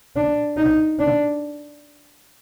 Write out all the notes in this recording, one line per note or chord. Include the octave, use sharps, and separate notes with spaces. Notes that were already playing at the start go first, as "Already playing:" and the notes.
D4
D#4
D4